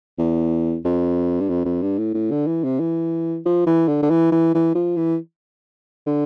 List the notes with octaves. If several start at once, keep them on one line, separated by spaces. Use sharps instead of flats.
E2
F2
G2
F2
F2
G2
A2
A2
D3
E3
C3
E3
F3
E3
D3
D3
E3
E3
E3
F3
E3
D3